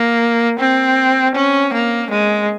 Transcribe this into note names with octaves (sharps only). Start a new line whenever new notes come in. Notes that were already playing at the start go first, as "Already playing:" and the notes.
Already playing: A#3
C4
C#4
A#3
G#3